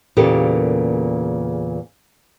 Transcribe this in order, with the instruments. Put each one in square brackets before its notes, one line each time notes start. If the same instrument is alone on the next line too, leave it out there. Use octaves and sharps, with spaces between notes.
[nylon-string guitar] E2 A#2 C#3 A#3 G4 A4